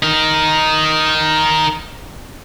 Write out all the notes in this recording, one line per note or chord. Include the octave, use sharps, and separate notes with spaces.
D#4 A#4